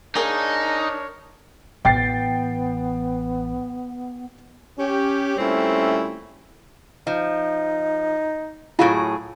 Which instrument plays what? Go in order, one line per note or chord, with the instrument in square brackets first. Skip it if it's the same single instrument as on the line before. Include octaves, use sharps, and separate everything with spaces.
[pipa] A#3 G#4 [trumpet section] D4 A#4 C#5 [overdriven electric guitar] D#4
[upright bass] A1 [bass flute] B3 [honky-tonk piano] G5 A6 C7
[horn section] C#4 G4
A#2 G3 A3 C4 C#4 E4
[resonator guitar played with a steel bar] F3 [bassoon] D#4
[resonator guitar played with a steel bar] A2 F#3 G#4 [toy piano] E4 F4 F5